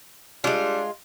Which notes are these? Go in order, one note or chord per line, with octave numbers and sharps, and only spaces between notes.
G3 G#3 D4 F4